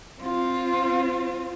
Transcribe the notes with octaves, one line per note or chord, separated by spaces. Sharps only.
C4 F4